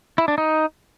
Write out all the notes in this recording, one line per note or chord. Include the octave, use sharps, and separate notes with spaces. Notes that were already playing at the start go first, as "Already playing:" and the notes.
E4
D4
D#4